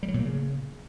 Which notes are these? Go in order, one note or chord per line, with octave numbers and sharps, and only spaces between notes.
G3
F#3
A#2
A#3
C#3